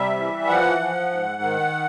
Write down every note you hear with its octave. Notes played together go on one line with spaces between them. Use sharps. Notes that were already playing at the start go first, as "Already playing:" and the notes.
Already playing: C3 G3 E5
E3
F3 F#5
F3
G#2
D#3